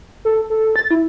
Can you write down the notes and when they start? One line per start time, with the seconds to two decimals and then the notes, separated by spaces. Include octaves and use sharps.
0.25 A4
0.50 A4
0.76 A6
0.91 E4